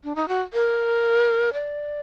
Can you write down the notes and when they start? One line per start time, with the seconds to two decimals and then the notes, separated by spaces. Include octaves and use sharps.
0.04 D4
0.15 D#4
0.28 F#4
0.53 A#4
1.53 D5